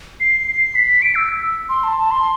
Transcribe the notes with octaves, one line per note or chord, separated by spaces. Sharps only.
C7
C7
B6
D7
E6
E6
C6
A5
A5
C6